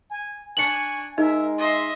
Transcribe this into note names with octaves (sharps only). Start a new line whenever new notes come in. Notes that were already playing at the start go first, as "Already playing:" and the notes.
G#5
D4 G#5 C#6 C#7 F#7
G#3 D#4 A#4 E5
D#5 E5 C6